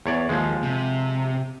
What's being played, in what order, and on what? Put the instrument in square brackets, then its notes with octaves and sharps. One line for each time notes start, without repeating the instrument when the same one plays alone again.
[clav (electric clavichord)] E2 C#5 D5
[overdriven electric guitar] D#2 [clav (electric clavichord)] F3 G#3
[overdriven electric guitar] C3